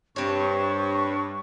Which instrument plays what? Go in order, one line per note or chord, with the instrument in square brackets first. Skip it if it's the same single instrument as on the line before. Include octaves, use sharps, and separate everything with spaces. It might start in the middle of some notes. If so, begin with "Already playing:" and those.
[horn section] G2 [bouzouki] C4 C#5 [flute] C#6